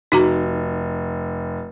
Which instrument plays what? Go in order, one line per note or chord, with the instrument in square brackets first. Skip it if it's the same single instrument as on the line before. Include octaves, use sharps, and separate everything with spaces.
[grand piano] F1 [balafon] D#4 F#4 A#5